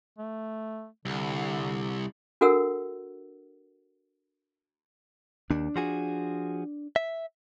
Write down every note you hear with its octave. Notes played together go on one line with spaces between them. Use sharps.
A3
C2 D3
D4 F#4 A4 A#4 F#5 E6
D#2 D4
F3 F#4 G#4
E5